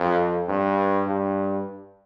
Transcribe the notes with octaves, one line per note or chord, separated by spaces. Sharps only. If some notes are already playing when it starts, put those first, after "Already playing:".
Already playing: F2
G2
G2